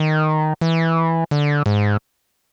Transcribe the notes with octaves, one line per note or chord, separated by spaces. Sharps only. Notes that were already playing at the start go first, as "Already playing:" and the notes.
Already playing: D#3
E3
D3
G#2